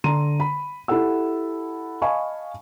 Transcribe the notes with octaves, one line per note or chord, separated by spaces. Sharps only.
D3 A#5 C6 D#7
B5
E4 G4 A4 F#5 E6
D#5 F5 G#5 A5 B5 C#6